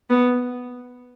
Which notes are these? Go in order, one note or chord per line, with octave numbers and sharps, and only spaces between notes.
B3